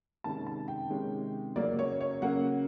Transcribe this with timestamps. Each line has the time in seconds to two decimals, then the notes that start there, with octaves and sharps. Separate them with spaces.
0.24 C3 D#3 G#3 C#4 A5
0.47 A5
0.68 G5
0.90 C3 D#3 G#3 C#4
1.56 C#3 F#3 A#3 C#4 D5
1.79 C#5
2.01 C#5
2.22 C#3 F#3 A#3 C#4 F#5